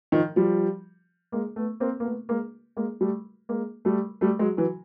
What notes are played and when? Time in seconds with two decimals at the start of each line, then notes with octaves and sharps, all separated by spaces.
0.12 D#3 F3
0.36 F3 G3
1.32 G#3 A#3
1.56 A3 B3
1.80 A#3 C4
2.00 A#3
2.04 A3 B3
2.29 G#3 A#3
2.77 G#3 A#3
3.01 G3 A3
3.49 G#3 A#3
3.85 G3 A3
4.21 G3 A3
4.39 F#3 G#3
4.57 E3 F#3